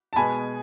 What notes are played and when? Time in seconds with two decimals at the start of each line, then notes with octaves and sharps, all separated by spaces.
0.13 A5
0.16 B2 G#3 B3 G#5 B5